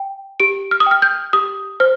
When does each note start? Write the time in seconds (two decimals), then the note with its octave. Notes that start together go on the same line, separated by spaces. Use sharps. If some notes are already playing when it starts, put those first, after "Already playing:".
Already playing: G5
0.40 G4 D7
0.71 F6
0.80 D#6
0.86 G5 F6
1.02 G6
1.33 G4 D#6
1.80 C5 F6